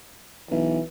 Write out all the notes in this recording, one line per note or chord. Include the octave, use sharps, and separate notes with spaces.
B1 E3